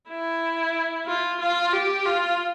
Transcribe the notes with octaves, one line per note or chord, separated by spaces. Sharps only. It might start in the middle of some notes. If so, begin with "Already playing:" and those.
E4
F4
F4
G4
F4